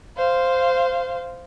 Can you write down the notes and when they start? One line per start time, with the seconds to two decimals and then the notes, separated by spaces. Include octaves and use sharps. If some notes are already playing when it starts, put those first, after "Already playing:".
0.17 C5 F5